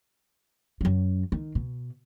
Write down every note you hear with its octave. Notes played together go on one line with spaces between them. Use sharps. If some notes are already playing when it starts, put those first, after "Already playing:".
F#2 F#3
D#3
B2